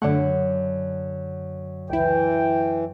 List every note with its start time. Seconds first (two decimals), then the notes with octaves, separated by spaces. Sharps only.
0.02 F#2 D3 A3 D4 F#5
1.90 C#2 E3 E4 G5